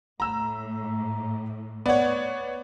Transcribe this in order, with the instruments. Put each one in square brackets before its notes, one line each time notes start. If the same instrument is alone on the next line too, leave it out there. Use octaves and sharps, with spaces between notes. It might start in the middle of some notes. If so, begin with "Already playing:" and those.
[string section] A2 [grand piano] A#5 E6
[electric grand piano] B3 C#5 [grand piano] D5 F#5